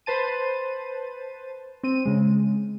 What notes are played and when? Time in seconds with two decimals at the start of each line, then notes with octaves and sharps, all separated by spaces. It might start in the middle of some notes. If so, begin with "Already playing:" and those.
0.06 B4 C5 A5 D#7
1.83 C4 D#7
2.05 C#3 G#3